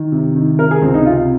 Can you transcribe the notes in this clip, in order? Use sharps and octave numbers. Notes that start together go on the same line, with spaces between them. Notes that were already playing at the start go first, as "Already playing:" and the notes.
Already playing: D#3
C3
D#3
C3 A#4
G#4
C#2 C4
D#4
C3 F4